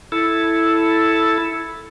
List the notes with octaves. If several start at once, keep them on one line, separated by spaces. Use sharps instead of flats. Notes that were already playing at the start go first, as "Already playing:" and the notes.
E4 A4